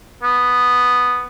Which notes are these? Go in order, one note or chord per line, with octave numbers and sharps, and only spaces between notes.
B3